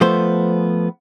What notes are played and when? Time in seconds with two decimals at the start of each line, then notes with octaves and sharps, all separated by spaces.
0.01 F3 A3 B3 C5